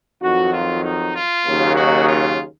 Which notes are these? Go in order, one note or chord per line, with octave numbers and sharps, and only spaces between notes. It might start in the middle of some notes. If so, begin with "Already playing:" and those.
F2 D#3 F#3 D#4 F#4
F4
D#4
F4
D#2 C#3 F#3 A#3
D#4 F#4
F4